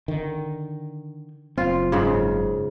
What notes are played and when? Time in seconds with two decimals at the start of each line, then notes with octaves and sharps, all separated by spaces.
0.08 D3 D#3
1.58 F#1 C4 F4
1.92 G#2 C#3